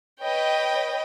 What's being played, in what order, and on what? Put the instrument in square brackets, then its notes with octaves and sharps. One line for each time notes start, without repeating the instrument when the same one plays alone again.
[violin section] B4 C#5 D#5 G5